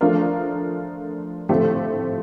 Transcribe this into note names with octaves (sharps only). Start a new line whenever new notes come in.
F3 A3 D4 F4 A#4
A2 F3 A3 C4 G4